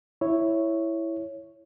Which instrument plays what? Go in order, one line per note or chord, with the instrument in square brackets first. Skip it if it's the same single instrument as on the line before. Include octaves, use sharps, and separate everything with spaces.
[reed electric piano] E4 C#5